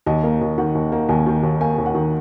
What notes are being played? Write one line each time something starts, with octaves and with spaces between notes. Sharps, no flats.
D#2 D#5
A#3
D#2
D#3 F#5
D#2
A#3
D#2 G#5
D#3
D#2
A#3 G#5
D#2
F#5
D#3